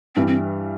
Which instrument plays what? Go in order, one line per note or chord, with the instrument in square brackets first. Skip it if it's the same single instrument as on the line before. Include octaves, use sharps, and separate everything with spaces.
[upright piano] G2 E3 G3 [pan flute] C4
[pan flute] C4